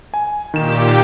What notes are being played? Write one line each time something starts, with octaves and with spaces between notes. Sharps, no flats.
G#5
A#2 D#3 G4 E7